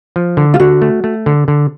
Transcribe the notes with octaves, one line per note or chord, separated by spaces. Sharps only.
F3
D3
F4
D3 F#4
A3
A3
D3
D3